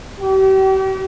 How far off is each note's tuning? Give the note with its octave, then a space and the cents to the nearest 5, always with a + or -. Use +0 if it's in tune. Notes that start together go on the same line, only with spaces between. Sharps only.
G4 -40